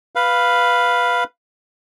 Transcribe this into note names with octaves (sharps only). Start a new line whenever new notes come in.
B4 F5